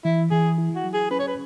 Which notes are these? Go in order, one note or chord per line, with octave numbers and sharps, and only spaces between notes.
E3 E4
E3 G#4
E4
F#4
F#3
G#4
C#4 B4
C#5
B4